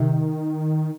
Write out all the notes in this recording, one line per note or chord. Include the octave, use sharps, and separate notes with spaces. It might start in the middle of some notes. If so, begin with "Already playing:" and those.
Already playing: C3 D#3